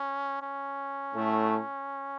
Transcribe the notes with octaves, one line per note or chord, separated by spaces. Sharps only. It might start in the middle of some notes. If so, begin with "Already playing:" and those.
Already playing: C#4
C#4
A2 A3